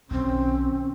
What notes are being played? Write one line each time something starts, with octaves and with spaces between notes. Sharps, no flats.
B1 D#3 C4 C#4